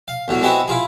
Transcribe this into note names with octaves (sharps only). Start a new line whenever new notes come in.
F5
E2 A2 F#3
G#3 B3 C4 E4 F#4 E5
E4 F4 G#4